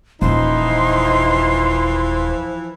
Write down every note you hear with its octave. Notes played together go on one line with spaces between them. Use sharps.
D#1 E3 F3 D#4 C6